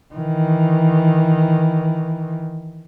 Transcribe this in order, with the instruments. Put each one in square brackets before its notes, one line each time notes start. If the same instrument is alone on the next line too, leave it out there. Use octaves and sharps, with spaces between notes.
[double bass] D#3 E3